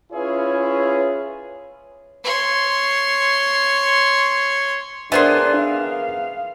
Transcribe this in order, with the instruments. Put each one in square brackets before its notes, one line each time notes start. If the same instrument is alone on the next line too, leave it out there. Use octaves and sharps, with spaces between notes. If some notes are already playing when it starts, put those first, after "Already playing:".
[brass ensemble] C#4 E4 F4 G#4 B4 C#5
[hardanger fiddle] C#5 C6
[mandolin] B3 G#4 C6 [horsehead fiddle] D4 [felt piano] A#4 C5 E5
[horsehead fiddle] F5